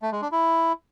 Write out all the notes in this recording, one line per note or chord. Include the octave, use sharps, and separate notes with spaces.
A3
G#3
D4
E4